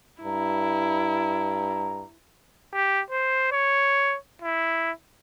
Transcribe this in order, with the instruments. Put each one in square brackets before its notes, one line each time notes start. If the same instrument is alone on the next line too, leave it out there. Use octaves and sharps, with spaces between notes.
[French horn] G2 [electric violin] E4 [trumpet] A#5
[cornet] G4
C5
C#5
E4